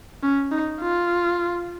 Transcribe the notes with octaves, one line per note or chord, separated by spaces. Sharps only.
C#4
D#4
F4